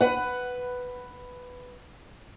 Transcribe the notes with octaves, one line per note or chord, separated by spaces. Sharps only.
B4 F#5